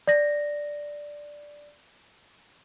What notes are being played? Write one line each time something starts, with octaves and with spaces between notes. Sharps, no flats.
D5 A#6